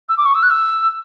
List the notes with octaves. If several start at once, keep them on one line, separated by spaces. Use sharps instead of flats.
E6
D6
C#6
E6
F#6
E6